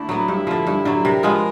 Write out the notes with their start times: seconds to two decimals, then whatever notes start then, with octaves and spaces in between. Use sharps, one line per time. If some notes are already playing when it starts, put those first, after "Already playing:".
Already playing: D3 A3 D4 E4
0.09 F#3 B3
0.28 G2
0.47 D3 F3
0.67 G2
0.85 D3 F#3
1.05 C3 A#4
1.23 F3 G#3 B3